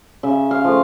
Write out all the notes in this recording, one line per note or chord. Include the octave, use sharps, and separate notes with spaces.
C#3 E5
F5
F3 A3